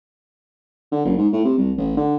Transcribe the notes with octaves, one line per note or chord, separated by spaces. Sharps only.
D3
F#1
G#2
A2
C3
C2
A1
D3